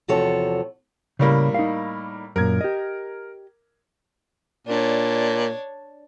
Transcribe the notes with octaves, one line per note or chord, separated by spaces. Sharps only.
E2 C3 F3 F#4 A4 C#5
A2 C#3 G3 A#3
D#4 F5
F#2 A#2 A#4 G#6
G4 D#5
A#2 D4 C#5